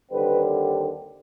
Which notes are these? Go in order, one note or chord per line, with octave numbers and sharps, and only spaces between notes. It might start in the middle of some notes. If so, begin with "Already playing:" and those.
D#2 D3 G3 C4 B4